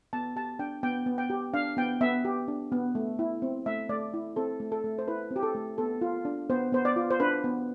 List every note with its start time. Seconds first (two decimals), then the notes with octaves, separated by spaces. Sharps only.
0.13 B3 A5
0.36 G4 A5
0.59 D4 G5
0.83 B3 G5
1.06 B3
1.18 G5
1.30 G4
1.54 D4 F5
1.77 B3 G5
2.01 B3 E5
2.25 G4
2.48 D4
2.72 B3
2.95 A3
3.19 E4
3.42 C4
3.66 A3 E5
3.89 A3 D5
4.14 E4
4.36 C4 A4
4.60 A3
4.72 A4
4.84 A3
4.99 C5
5.08 E4 B4
5.31 C4
5.36 G4
5.43 A4
5.55 A3
5.78 B3 A4
6.01 F4
6.25 D4
6.50 B3 C5
6.72 B3 C5
6.85 D5
6.96 F4
7.11 C5
7.20 D4 B4
7.44 B3